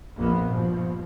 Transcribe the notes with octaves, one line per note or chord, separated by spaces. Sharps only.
A#1 F2 A#2 A#3 B3
G2 B2 F3